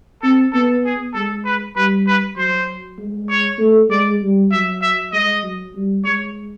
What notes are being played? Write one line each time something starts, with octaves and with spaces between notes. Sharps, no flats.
C4 A4
B3 A4
G#4
G#3 A4
B4
G3 B4
B4
F#3 C5
G#3
C#5
A3
G#3 D5
G3
F#3 E5
E5
G#3 D#5
F#3
G3
G#3 C#5